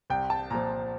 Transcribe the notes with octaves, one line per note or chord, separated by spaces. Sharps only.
C2 G5
A5
A#2 F3 A#5